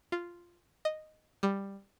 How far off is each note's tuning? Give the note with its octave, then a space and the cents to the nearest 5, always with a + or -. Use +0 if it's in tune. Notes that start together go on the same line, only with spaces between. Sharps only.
F4 -5
D#5 -5
G3 +10